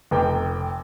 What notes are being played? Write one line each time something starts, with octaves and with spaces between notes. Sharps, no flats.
F1 G5 D6